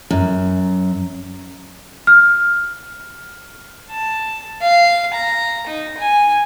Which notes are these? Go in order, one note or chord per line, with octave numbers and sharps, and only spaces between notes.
F#2
F6
A5
F5
A#5
D#4
G#5